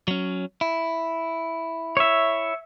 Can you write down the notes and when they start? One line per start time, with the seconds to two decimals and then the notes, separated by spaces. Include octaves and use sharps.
0.08 F#3 C#4
0.61 E4
1.97 C#5 E5